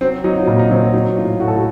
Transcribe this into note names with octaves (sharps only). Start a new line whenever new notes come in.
F#3 C4
F#3 D#4
F4
A#2 D#4
D#4
F#3 C4
C4
F#3 D#4
A2 F4
A2 F#4
A4
F#4